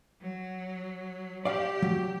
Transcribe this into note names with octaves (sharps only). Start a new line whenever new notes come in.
F#3
G4 D5 F5
F#3